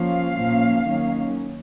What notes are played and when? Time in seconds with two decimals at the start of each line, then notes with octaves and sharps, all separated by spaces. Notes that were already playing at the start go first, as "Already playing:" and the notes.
Already playing: F3 A#3 C#4 F5
0.36 A#2 F3 A#3 C#4
0.84 D#3 F#3 A#3 C#4